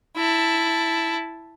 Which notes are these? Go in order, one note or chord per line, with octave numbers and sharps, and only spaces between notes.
E4 A5